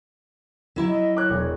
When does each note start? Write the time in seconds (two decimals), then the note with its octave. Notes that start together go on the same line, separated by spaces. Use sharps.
0.76 F#3 E4 E5
0.88 D#5
1.17 C#5 D6 F#6
1.30 E1